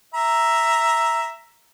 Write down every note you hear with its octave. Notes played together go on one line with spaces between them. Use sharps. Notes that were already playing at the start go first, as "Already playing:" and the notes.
E5 A#5